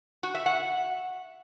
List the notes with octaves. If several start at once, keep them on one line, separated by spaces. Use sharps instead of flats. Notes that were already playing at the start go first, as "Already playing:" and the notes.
F#4
E5
F#5